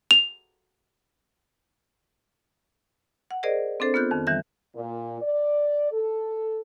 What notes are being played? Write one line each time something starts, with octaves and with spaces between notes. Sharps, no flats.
F7
F#5
G#4 A#4 C5 D5 D#5
C4 D4 A4 C5
B3 F4 F#6 G6
F2 D#3
D#3 E3 G3 E5 G6
A#2
D5
A4